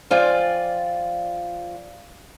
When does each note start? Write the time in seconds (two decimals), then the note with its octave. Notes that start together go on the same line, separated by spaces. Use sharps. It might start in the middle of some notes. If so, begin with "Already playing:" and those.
0.10 F3 F4 D5 G5 G#5